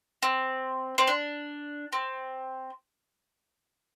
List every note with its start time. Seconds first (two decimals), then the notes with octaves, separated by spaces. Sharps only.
0.23 C4
0.98 C4
1.07 D4
1.93 C4